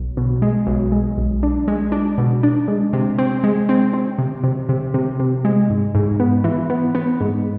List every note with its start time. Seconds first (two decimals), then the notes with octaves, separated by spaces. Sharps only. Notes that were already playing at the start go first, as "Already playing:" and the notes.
Already playing: B1
0.17 B2
0.42 G#3
0.67 B1
0.92 G#3
1.18 B1
1.43 D4
1.68 G#3
1.92 D4
2.18 B2
2.43 D4
2.68 G#3
2.93 C3
3.18 C4
3.44 G#3
3.69 C4
3.93 C4
4.18 C3
4.44 C3
4.69 C3
4.94 C3
5.20 C3
5.45 G#3
5.70 G#2
5.95 G#2
6.20 B3
6.44 E3
6.70 B3
6.95 B3
7.21 G#2